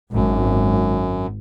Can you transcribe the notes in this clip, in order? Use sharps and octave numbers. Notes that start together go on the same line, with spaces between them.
G#1 F#2